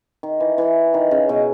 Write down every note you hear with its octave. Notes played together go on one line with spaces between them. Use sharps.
D#3
E3
E3
D#3
C#3
B2